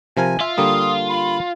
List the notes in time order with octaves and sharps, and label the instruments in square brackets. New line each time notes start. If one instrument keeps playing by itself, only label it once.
[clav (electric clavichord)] C3 F3 A#4 [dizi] G#5
[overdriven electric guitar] F4 [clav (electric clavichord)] E5
[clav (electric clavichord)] D3 G3 A#3 [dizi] D#6
[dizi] B5